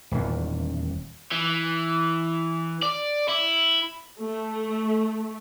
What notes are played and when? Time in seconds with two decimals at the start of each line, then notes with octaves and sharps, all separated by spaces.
0.11 D#1 E2
1.32 E3
2.83 D5
3.29 E4
4.19 A3